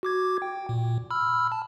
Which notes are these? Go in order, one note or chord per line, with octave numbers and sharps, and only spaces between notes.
F#4 D6 G#6
G5
A#2
B5 E6 F6
A5